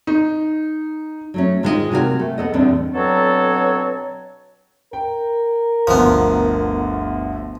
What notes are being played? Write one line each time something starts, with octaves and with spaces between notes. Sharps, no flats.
D#4
F#3 A3 C#4
G#2 D#3 G#3 F4 G#4 D#5
C3 F#4 A#4 C#5 G#5
A3
B3 A4 D#5
E2 A2 D3 G3 C4 D4
B2 D3 F#3 C4 A4 C#5
A#4 G5
G1 D2 F3 B3